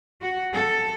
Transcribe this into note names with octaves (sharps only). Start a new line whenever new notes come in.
F#4
A4